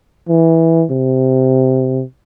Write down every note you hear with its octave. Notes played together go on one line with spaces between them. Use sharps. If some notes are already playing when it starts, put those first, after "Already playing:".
E3
C3